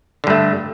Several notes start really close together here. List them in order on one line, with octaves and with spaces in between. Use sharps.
D3 G2 A3